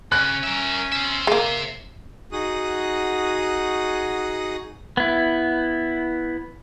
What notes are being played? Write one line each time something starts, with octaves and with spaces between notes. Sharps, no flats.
C#3 C#4 G#5 F#6
A#4 E5
C5 E5
G#3 A#3
D#4 F#4 G#4 F#5 D#6
B3 E4